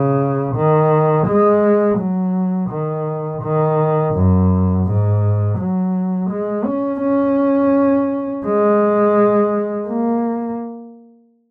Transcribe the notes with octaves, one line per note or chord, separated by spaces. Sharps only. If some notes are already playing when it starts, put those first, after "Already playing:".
Already playing: C#3
D#3
G#3
F#3
D#3
D#3
F#2
G#2
F#3
G#3
C#4
C#4
G#3
A#3